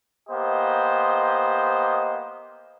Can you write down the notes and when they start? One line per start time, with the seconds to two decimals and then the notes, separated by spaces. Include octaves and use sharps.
0.30 A#3 B3 G4 C5 D#5